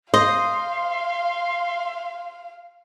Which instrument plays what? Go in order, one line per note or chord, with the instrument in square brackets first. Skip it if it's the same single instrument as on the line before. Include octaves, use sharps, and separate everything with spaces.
[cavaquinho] C5 [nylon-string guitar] D#5 [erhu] F5 [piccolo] C6